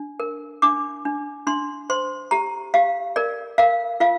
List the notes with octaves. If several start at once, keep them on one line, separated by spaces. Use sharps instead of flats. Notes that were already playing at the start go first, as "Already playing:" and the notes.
Already playing: D4
A#4
D4 D6
D4
D4 C6
C5 C6
G4 A#5
G4 F5
A#4 D5
A#4 F5
F4 F5